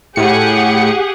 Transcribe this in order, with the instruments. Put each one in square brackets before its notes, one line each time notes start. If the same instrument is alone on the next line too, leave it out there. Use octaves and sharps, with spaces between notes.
[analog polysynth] A2 C#7 [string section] G4 G#4 F#5